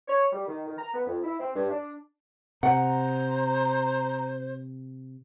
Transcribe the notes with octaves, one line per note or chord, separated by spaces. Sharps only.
C#5
G3
D#3
D#3
A#5
B3
F2
E4
C4
G2
D4
C3 C5 F#5 A#5